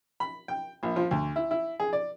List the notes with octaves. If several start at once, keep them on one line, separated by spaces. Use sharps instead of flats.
B5
G5
A#1
F3
D2
E4
E4
G#4
D5